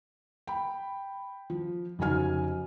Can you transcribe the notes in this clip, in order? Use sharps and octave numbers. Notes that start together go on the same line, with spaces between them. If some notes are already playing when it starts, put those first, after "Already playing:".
G5 B5
F3
F1 C#3 F#3 D#4 G#5 F6